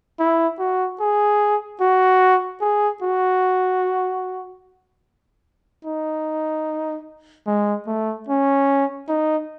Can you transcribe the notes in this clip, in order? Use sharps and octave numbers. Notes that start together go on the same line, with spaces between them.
E4
F#4
G#4
F#4
G#4
F#4
D#4
G#3
A3
C#4
D#4